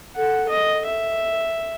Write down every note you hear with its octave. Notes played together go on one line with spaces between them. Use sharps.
A4 F#5
D#5
E5